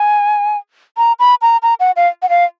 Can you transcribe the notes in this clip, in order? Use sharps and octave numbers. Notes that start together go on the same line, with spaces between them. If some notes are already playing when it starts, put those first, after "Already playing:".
Already playing: G#5
A#5
B5
A#5
A#5
F#5
F5
F#5
F5